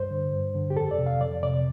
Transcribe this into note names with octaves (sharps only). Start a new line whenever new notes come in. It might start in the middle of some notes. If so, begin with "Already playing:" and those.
Already playing: G2 C5
D3
G2
D3
G4
F2 A4
D5
C3
F5
F2 D5
C3 D5